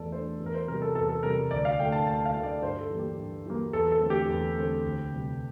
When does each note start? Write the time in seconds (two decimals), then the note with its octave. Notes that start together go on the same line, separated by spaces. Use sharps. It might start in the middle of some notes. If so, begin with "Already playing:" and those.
Already playing: E2 E3 A3 A4 D5
0.12 E3 A3 D4 C5
0.40 E2
0.46 A#4
0.54 C5
0.68 C3 G3 A#4
0.82 A4
0.95 E2 A4
1.09 A4
1.23 C3 G3 A#4
1.51 D2 D5
1.65 F5
1.79 D3 A3 E4 G5
1.92 A5
2.06 D2 A5
2.25 F5
2.34 D3 A3 E4
2.43 D5
2.62 G2 C5
2.81 A4
2.89 E3 G3 A#3
2.99 G4
3.18 G2
3.46 E3 G3 A#3
3.73 E2 A4
3.92 A4
4.01 D3 A3 C4
4.10 G4
4.29 E2
4.57 D3 A3 C4
4.84 D2
5.12 C3 G3